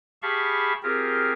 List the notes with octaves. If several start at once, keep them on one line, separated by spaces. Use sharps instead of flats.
G4 G#4 F5 A5 B5 C#6
C4 F4 G4 G#4 A#4